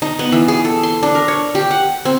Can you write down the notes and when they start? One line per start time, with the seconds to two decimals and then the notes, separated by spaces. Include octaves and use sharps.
0.02 D#4
0.19 B3
0.32 E3
0.48 G#4
0.65 A4
0.83 C6
1.03 D4
1.15 A#4
1.28 C#5
1.55 G4
1.71 F#5
2.05 C4